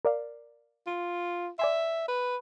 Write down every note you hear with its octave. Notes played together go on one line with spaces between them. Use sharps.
A#4 D5 F5
F4
D5 E5 G#5 C6
B4